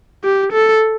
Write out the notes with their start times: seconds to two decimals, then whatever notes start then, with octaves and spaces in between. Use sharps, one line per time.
0.24 G4
0.53 A4